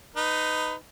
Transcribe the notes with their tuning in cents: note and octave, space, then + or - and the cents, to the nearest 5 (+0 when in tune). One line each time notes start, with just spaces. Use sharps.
D#4 -5 B4 +20